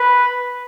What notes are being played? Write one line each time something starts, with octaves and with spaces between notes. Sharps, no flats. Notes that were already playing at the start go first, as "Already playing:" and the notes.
Already playing: B4